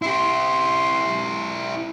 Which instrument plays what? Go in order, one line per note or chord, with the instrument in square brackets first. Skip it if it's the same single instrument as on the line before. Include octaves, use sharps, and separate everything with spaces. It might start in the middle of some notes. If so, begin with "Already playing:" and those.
[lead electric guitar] E4 G4 [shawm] C6